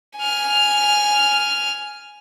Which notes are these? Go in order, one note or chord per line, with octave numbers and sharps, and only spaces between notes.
G#5 F6